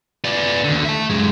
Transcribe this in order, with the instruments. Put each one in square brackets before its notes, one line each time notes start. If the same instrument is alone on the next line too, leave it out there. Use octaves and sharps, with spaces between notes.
[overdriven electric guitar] B3 D5
D#2 D3
E5 A5
F#2 G#3